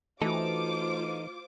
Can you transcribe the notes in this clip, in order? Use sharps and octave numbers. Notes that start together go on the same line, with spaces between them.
E3 A3 D#4 F4 F#4 A4 C5 D6